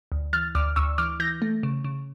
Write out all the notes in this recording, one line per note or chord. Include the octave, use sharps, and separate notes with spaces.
D2
E3 F6 A6
D2 D6 F6
D2 C#6 E6
E3 D6 F6
E3 G6 A#6
A3
C#3
C#3